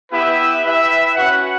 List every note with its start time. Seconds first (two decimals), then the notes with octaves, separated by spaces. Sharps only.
0.10 B3 E4 G4 B4 E5
0.63 E4 B4 E5 G5
1.16 C#4 F#4 B4 F#5